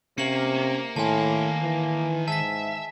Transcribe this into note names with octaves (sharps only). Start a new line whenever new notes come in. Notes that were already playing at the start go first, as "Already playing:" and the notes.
C3 A#3 C#4 C#7 F#7
A2 D#3 G#5 A5 C6
E3
G#2 E5 A5 B6